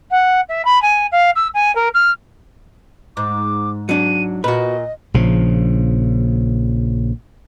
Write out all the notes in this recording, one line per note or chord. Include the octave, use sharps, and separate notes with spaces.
F#5
E5
B5
G#5
F5
E6
G#5
A#4
F6
G#2 D6
F#3 D4 D#7
A#2 F#4 B4 D#5
A#1 C#3 F3